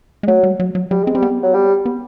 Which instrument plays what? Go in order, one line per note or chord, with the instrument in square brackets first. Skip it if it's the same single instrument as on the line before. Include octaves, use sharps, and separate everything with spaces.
[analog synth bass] G#3
[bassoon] F#3 [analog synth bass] A3
[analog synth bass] G3
F#3
F#3
[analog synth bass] F#3 [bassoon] G3
[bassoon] G#3 [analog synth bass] C4
[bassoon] G3 [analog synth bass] C4
[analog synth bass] B3
[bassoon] F#3
G3
[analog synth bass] B3